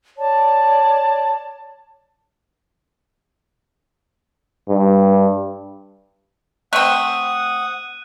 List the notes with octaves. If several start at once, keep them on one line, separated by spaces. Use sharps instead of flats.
C#5 D5 A5
G2
A3 C4 F#5 D#6 F#6 D#7